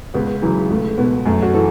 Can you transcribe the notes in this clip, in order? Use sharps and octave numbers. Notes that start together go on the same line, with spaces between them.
C#2 B3
C#3 E3 F#3
C#2 A3
B2 B3
F#2 A3
F#4
E3 A4